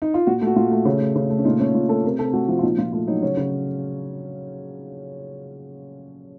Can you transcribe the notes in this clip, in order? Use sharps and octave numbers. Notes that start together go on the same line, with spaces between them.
D#4
F4
A#2 F#4
A3
F#4
A#2 F4
A3
C#3
A3
C#3
A3
C#4
A#2 D#4
A3 C#4
A#2 F4
A3 A4
C3 A#4
C3 A4
A3 F#4
F3 F4
F4
A#2 D#4
A#2 F4
A3 F4
F#3 D#4
C#3 C#4
C#3